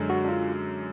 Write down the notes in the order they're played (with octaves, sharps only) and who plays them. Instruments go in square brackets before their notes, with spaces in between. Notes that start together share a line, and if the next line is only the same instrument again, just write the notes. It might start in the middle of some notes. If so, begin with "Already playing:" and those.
Already playing: [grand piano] F#2 D3 G#3
[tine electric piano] F#4
D4
F4